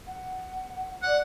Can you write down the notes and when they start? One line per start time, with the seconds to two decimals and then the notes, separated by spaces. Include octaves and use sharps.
0.07 F#5
1.03 D5 F#5